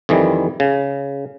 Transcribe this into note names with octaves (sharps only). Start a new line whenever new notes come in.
F2 D#3 E3 G3
C#3